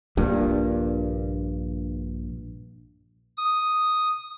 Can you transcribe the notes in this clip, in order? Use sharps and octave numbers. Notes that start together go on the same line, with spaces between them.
A#1 G2 A#2
D#6